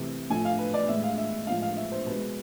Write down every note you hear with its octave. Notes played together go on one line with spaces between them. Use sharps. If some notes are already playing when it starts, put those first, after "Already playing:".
Already playing: C3 E3 A3
A2 F3 A3 G#5
F5
B4
D5
A2 G#3 E5
F5
E5
A2 F3 G#3 F5
F5
E5
C5
B2 G#3 B4